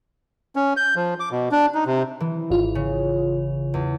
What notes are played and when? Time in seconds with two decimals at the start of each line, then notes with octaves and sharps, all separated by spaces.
0.56 C#4
0.77 G6
0.96 F3
1.20 D6
1.31 B2
1.52 D4
1.75 D#4
1.86 C3
2.20 E3
2.50 G#1 F4
2.75 C#3
3.74 E2